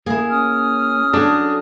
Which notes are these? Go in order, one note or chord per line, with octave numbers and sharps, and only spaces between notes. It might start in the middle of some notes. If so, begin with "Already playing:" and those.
A#3 E4 G#4
C#4 D#6 F6
F#3 D4 A4